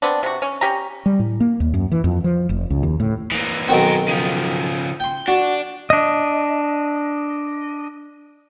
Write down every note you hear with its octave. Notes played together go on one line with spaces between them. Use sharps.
B3 C4 D4
C3 F#4
C#4
C#4 G4 A#5
G3
A2
A#3
D#2
F#2
E3
F2
F3
F1
C#2
D#2
A2
E3 A#3
B1 D#3 C4 F#4 A#4
C#3 F3
G5 C6
D4 F#4
D4 D#5